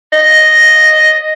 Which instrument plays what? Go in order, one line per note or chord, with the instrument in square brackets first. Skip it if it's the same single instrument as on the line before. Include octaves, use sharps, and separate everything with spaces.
[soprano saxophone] D#5